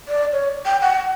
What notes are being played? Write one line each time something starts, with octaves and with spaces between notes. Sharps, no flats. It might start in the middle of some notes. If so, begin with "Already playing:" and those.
D5
C#5
G5
F#5